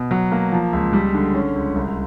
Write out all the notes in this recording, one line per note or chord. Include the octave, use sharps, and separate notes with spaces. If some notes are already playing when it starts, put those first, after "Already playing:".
Already playing: B2
F#3
A#3
F3
C#2
G3
D3
C#4
C#2
C2